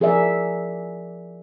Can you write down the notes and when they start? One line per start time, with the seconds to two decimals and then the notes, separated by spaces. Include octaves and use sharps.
0.01 F3 G#4 A#4 D5 E5